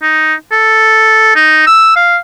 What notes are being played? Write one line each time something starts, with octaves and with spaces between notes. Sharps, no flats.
D#4
A4
D#4
E6
F5